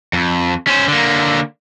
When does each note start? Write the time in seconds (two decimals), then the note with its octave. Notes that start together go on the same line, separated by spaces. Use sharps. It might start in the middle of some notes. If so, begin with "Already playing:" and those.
0.13 F2
0.67 C#4 C5
0.88 D3 A#3